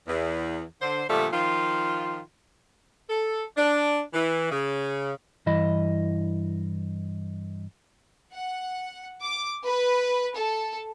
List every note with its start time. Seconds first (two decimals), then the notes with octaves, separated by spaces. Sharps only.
0.08 E2
0.82 D3 C5
1.10 A#2 D3 F3 G3 A3
1.33 D#3 F3 F4
3.10 A4
3.57 D4
4.14 E3
4.51 C#3
5.46 G2 E3 E4 D#5 B5
8.34 F#5
9.23 D6
9.65 B4
10.35 A4